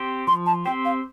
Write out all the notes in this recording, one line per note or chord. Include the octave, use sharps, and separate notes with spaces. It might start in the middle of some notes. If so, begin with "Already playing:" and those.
Already playing: C4 G4 C5
F3 C6
A5
C4 G4 C5 G5
F5